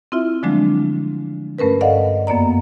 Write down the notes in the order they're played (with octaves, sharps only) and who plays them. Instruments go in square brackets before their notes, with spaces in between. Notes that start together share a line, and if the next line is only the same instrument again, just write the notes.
[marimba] C4 E4 F4 E5
D3 F3 F#3 G#3 A3 D4
G2 A3 C#4 A#4 B4
A4 D5 D#5 F5 F#5
F#2 A#3 B3 D5 A#5